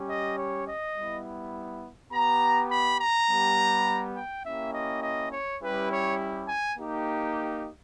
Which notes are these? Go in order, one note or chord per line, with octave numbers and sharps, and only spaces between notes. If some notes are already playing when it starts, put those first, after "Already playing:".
Already playing: G3 C#4 G4
D#5
C#5
D#5
G3 B3 E4
B3 G4 A#5
B5
A#5
G3 B3 G4
G5
A#3 C#4 E4 G4 E5
D#5
D#5
C#5
G3 C#4 E4 G4 B4
C#5
G#5
A#3 D#4 G4